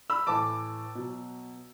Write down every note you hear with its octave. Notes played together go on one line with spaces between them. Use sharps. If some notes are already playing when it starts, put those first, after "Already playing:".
B5 E6
A2 E3 A5 D6
B2 F#3